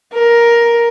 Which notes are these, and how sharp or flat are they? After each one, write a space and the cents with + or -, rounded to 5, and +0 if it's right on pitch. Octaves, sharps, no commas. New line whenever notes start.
A#4 +10